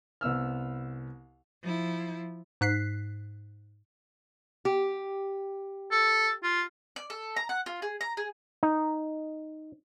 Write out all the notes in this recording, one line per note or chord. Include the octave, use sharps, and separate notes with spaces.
C2 B3 E6 F6
F3 E4
G#2 F#6 B6 C7
G4
A4
F4
D5
A4
A#5
F#5
F4
G#4
A#5
G#4
D#4